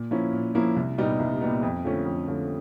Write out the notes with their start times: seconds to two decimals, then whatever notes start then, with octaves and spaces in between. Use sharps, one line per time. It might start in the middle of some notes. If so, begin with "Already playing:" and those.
Already playing: A#2
0.11 F3 A#3 C#4 E4
0.33 A#2
0.55 F3 A#3 C#4 E4
0.76 C2
0.98 A#2 G3 B3 D#4
1.19 C2
1.41 A#2 G3 B3 D#4
1.62 F2
1.85 D3 F3 A3 C#4
2.06 F2
2.28 D3 F3 A3 C#4